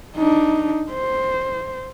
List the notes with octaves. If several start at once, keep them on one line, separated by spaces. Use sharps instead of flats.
D4 D#4
C5